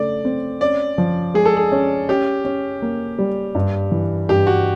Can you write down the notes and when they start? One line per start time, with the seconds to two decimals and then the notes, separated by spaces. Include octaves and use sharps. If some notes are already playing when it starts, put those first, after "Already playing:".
Already playing: C#3 A3 D5
0.25 C4
0.61 C#4 D5
0.98 F3
1.34 G#3 G#4
1.45 A4
1.57 G#4
1.72 C#4
2.09 C#4 G4
2.45 C#4
2.82 A#3
3.19 G3
3.55 G2
3.92 E3
4.29 G2 G4
4.47 F#4